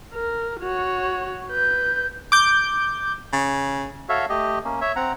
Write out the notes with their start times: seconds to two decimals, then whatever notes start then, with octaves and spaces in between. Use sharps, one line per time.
0.14 A#4
0.61 F#4 C#5
1.50 B4 G6
2.32 D6 G6
3.33 C#3
4.09 F#4 A4 C#5 E5 F5
4.29 A3 G4 D#5
4.65 A#3 C#4
4.81 C#5 E5
4.96 C4 F#5 A#5